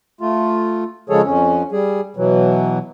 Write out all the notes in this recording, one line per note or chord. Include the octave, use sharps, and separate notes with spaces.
A3 F4
C#3 F3 G#3 G#4 A4 C#5
F2 C#4
G3 G#4
B2 E3 F#3